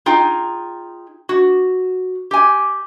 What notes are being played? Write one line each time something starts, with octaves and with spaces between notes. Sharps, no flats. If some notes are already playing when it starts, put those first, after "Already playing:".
D#4 F4 G#4 G5
F#4
G4 G#5